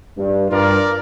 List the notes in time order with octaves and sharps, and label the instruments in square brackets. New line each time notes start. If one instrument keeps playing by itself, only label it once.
[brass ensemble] G2
[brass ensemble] G2 [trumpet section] F4 A#4 D5